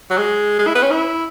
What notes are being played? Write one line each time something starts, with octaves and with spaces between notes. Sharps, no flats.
F#3
G#3
G#3
E4
B3
C#4
E4